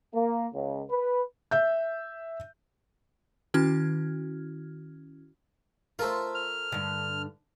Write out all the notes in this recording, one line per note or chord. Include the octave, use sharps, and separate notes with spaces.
A#3
C#2
B4
E5 G6
D#3 C#4 E4 F#4 F6 G#6
A3 F4 A4 A#4 C5
F6
G2 D3